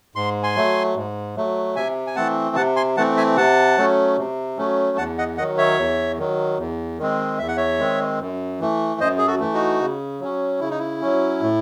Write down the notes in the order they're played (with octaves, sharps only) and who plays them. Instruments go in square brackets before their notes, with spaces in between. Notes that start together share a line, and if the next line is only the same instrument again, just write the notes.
[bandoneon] G#2 C6
G#5 C6
F#3 A3
G#2
F#3 A3
C3 E5 G#5
G#5
E3 A3 C4 F#5 A5
C3 F#5 A5
G#5 C6
E3 A3 C4 F#5 A5
E5 G#5
C3 F#5 A5
F#3 A3 C#4
C3
F#3 A3 C#4
E2 F#5 A5
D#5 F#5
D#3 D#5 F#5
F#3
C#5 E5
E2
D#3 F#3
E2
D#3 G#3 C4
E2 E5
F#5
C#5 E5
D#3 G#3 C4
F#2
E3 A3
F#2 C5 D#5
G#4
F#4 A4
E3 A3
D#4 F#4
C#3
F#3 C#4
C#3 E4
D#4
E4
F#3 C#4
A2